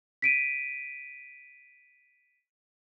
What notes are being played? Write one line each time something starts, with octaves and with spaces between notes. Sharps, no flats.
B6 D7 D#7